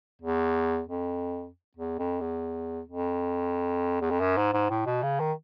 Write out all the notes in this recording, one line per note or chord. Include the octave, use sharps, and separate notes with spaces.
E2
F2
E2
F2
E2
F2
E2
F2
F#2
G#2
G#2
A2
B2
C#3
D#3